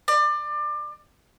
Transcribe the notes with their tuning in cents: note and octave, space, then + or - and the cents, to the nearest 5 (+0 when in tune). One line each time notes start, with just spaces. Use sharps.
D5 +25